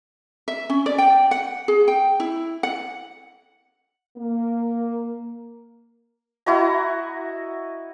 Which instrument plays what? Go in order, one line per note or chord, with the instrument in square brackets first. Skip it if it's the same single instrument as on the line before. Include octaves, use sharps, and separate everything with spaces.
[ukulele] E5
C#4
D5
G5
F#5
G#4
G5
E4
F#5
[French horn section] A#3
[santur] E4 F#4 D#5 A#5